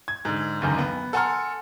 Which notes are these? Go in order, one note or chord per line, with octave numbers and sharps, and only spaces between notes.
G#6
G#2 D3
G1 C#2 F#2 D#3
B3
A4 F#5 G#5 A#5 C6 F6